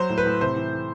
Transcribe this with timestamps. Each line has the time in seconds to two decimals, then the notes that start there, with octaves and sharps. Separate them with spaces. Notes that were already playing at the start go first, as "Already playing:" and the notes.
Already playing: F#3 C5
0.10 A2
0.18 B4
0.26 A2
0.41 C3 C5
0.56 E3
0.73 E3